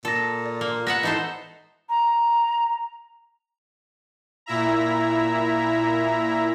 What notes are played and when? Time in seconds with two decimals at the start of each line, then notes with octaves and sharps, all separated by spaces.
0.05 A#2 A4 A5 A#6
0.46 D5
0.61 A#3
0.87 B3 E5 F#5 A#6
1.03 E3 D#4 A4 C5 D#5 A5
1.89 A#5
4.46 A#2 E4 E5 A#5